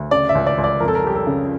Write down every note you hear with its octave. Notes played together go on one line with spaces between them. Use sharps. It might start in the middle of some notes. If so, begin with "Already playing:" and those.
Already playing: D2
C#3 D5
E5
C#2
D5
C#2
D5
F2 A#4
A4
A#4
G3 G4
A4
C#3